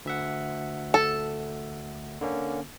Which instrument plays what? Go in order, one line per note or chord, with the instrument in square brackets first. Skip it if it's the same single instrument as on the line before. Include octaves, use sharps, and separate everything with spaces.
[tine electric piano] D2 E5 F#5
[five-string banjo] A4
[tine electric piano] D3 A#3 C#4